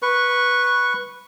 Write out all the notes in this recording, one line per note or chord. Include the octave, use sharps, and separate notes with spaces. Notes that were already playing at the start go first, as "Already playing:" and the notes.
B4 C#6